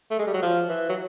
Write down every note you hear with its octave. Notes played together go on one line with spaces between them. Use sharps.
A3
G#3
G3
F#3
F3
E3
F#3